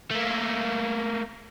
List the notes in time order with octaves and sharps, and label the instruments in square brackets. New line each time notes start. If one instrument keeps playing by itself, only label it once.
[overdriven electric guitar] A3 A#3